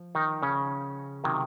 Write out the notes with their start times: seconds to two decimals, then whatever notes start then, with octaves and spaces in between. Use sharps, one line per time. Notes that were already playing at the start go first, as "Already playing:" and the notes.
Already playing: F3
0.15 D#3 D#4
0.42 C#3 C#4
1.24 C3 D#3 F#3